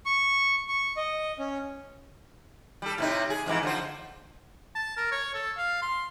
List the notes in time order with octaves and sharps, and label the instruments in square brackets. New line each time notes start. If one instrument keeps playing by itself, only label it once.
[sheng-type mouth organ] C#6
C#6
D#5
C#4
[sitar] G3 A4
A2 C3 D#4
G#4
F2 G#2 E3
D3 F3 C5
[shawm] A5
A#4
C#5
A4
F5
C6